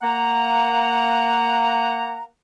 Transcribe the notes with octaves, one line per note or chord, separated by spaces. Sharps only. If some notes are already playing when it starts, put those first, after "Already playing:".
A#3 F#5 A#5